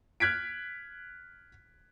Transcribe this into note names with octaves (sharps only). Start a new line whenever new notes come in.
F6 F#6 G#6 B6 D7